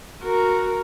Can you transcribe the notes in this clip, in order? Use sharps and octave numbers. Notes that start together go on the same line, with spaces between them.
F#4 A#4